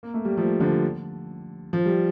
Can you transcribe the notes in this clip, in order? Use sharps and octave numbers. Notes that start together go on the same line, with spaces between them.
A#3
A3
G3 A#3
F3 A3
D3 F3
F3
G3